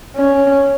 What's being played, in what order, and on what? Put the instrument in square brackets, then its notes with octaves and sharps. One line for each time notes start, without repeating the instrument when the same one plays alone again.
[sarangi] C#4